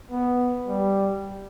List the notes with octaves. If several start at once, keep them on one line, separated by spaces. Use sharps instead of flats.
B3
G3